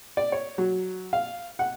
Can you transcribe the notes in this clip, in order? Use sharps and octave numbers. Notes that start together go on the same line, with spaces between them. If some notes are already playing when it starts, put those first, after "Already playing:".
D5
C#5
F#3
F5
F#5